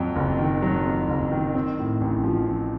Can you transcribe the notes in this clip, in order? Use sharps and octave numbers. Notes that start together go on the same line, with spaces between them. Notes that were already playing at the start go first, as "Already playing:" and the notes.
Already playing: F2 F#3
F#1
D#3
F#3
F2
F#1
D#3
C4
A2
A1
F3
C4